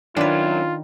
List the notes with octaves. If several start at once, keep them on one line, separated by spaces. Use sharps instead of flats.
F#2 D#3 C#4 D4 F4 B4